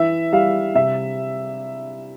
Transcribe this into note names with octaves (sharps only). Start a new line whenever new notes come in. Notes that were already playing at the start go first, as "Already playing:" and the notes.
Already playing: E3 E5
G3 F5
C3 E5